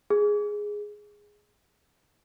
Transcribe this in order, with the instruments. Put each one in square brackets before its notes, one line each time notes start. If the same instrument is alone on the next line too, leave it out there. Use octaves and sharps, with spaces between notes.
[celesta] G#4